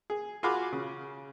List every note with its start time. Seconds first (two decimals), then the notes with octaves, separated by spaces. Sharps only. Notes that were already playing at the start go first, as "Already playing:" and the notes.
0.10 G#4
0.43 F4 F#4 G#4 F5 B5 D6
0.72 C#3